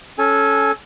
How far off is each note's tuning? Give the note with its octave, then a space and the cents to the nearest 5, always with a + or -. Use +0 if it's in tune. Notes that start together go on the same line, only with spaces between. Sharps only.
C#4 +0 A4 -15 G#5 +0